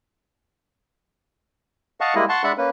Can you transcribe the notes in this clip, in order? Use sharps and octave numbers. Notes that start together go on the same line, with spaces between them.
D#5 F5 F#5 A5 C#6
G3 G#3 A#3 E4 D#5
F#5 A5 C6 C#6
G#3 D4 E5 F#5 A5 B5
A#3 C#4 B4